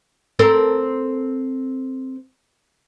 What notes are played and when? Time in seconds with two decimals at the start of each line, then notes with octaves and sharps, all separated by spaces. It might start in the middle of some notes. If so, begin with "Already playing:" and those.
0.39 C4 A4 A#4